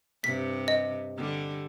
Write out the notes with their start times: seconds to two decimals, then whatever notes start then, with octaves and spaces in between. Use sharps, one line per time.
0.24 G2 C3 B6
0.68 D#5
1.17 D3 G3